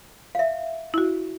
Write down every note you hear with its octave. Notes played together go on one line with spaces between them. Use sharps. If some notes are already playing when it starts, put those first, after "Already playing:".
E5 F5
E4 F#4